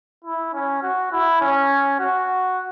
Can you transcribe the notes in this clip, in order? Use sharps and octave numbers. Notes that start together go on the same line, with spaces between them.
E4
C#4
F#4
E4
C#4
F#4